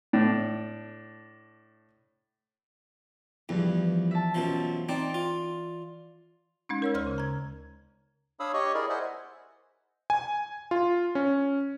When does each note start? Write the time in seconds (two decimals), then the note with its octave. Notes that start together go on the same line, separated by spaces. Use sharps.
0.13 A2 D4
3.49 E2 G2 E3 F3
4.11 E5 A5
4.34 F#2 B2 F3
4.89 C4 D#4 D5
5.14 F4
6.69 G#3 C#4 D#4
6.82 A#4 C#5 E6
6.94 D2 C5 C6 F6
7.07 C#3
7.18 A#5 G#6
8.40 D4 C#5 F5 B5 D#6 E6
8.53 G4 C#5 D#5 C#6
8.74 E4 G#4 A#4 D5
8.89 C5 D#5 E5 F#5 G#5
10.10 G#5
10.71 F4
11.15 C#4